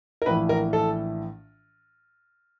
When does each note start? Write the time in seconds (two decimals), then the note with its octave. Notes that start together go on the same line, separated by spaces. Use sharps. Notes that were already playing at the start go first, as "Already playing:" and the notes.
0.22 A#4
0.26 A#1 A2 E3 B4
0.49 A#4
0.73 A4